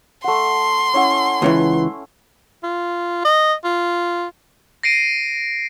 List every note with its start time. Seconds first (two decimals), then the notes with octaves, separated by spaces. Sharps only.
0.24 A3 F#5 C6
0.93 C#4 E4 F#5
1.42 C#2 C#3 E3
2.63 F4
3.25 D#5
3.64 F4
4.83 A#6 C7 D7 D#7